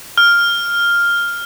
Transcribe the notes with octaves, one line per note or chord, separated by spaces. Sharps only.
F6